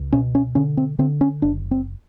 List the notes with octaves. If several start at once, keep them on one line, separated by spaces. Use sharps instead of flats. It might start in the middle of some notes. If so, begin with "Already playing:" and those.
Already playing: C#2
B2 C#4
C#4
D3 C#4
C4
D3 C4
C#4
F#1 D4
C4